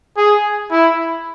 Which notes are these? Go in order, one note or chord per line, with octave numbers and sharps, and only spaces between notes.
G#4
E4